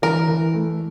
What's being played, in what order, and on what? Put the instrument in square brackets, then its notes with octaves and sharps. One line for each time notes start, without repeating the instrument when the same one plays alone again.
[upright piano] E3 [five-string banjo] A#4
[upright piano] E3
A3